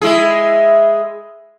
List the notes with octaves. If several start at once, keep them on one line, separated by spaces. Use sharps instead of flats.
G#3 E4 G#4